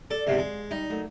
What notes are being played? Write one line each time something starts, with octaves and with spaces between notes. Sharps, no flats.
A4 D5
E2 G#2 C3 F5
G#3
G3 D#4
F#3 A3 A#3